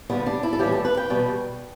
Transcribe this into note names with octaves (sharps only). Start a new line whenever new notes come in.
D2 D3 G3 B3
D4
E4
A4
A2 E3 G3 G4
A4
B4
G5
E2 B2 G3